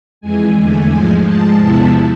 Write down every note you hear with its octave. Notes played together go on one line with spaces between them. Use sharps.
F2 E3 G#3 G#5
E2 D3 A3
G#2 F3 G#3
G#2 F3 G#3 A5
E2 C3 F3 B3 E4